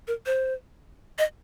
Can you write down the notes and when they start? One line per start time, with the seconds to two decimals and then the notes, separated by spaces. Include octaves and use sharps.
0.07 A#4
0.26 C5
1.18 D#5